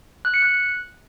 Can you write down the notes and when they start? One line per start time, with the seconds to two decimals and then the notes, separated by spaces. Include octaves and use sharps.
0.25 F#6
0.34 C#7
0.43 F#6